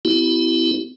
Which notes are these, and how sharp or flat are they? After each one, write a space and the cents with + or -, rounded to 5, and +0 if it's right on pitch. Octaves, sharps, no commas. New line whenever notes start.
C4 -45 E4 +0 G4 -40